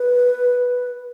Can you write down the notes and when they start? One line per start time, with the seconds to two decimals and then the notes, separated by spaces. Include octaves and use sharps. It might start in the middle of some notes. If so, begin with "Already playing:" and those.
Already playing: B4